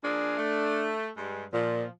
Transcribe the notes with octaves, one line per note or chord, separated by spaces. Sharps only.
F3 A#3 D4 G#4
A3
G2 G#3
A#2 F3